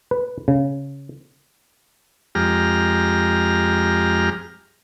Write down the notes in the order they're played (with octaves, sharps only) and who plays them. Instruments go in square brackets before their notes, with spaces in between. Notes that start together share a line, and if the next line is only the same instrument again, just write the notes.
[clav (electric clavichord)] B4
C#3
[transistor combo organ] F2 G#3 G4 A#5 F6